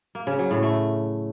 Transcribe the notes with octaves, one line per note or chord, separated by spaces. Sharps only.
A#3
C#3
F#3
A2
A3